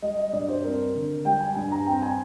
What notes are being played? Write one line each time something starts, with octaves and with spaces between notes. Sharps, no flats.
G3 D#5
D#5
G2 D5
C5
C4 A#4
D3
G3 G5
G#5
G2 G#5
A#5
C4 G5
G#5